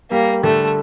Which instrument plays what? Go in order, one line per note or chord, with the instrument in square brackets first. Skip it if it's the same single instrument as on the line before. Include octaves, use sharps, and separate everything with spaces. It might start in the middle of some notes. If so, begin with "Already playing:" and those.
[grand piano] G3 [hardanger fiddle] A#3
[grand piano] D3 [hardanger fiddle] A3